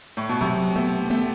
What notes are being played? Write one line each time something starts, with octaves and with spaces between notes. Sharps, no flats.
A2
B2
C3 F#3
A3 B3
A3 B3